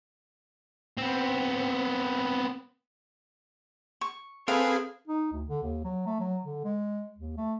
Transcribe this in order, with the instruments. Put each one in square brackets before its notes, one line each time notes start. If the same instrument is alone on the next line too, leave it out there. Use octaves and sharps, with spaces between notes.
[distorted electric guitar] B3 C4
[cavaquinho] C#6
[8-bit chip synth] C4 A4 B4 [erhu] G#4 [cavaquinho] F5
[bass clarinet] D#4
D2
D3
D#2
F#3
A3
F#3
D3
G#3
D#2
A3